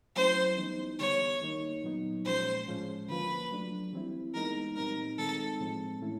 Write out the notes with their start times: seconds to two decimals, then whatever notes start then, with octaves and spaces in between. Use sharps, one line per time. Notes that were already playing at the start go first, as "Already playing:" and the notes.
0.16 F#3 A3 C#4 E4 C5
0.58 E3 G3 B3 D#4
0.99 D3 G3 B3 C#5
1.41 D#3 G3 A#3 D#4
1.84 A#2 F#3 B3 D#4
2.25 A#2 F3 G#3 C#4 C5
2.67 A2 F3 G#3 C#4
3.09 D3 F3 A#3 B4
3.51 F#3 A3 D4
3.93 E3 G3 C4 E4
4.34 E3 G#3 B3 D#4 A#4
4.76 A#2 G3 C4 D#4 A#4
5.18 D#3 G#3 C4 D#4 A4
5.60 A2 F3 G#3 C4
6.02 A2 E3 A3 C#4 E4